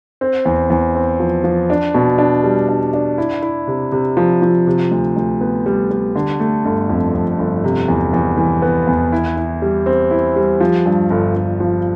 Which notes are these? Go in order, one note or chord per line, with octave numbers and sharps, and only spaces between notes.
C4
E2
E2
C4
F3
F3
D4
B2
D4
G3
D4
D4
E4
E4
C3
C3
F3
F3
C3
D2
D2
B3
G3
G3
D3
A3
G1
F2
F2
G1
C3
E2
E2
E3
B3
E2
E4
E4
G3
C4
E4
G3
F3
G2
G1
G1
F3